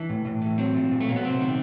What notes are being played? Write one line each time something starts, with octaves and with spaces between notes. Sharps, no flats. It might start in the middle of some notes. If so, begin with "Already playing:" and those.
Already playing: E3 D4
A2
A2
E3
F#3 C4
A#2
A#2
A3
F#3 A#3
B3
C3 C4
D#3